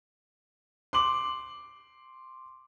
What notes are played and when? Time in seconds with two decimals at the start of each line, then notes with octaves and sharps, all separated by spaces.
0.93 C6 D6 F#7